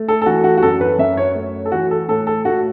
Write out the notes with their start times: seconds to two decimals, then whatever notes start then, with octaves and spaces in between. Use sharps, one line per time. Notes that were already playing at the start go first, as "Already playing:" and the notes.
Already playing: A3
0.08 A4
0.22 A4
0.26 E3 F#4
0.44 F#4
0.58 F#4
0.63 F#2 A4
0.81 B4
0.99 F#2 E5
1.17 C#5
1.35 A3
1.66 A4
1.72 E3 F#4
1.91 A4
2.08 A2 A4
2.27 A4
2.45 A3 F#4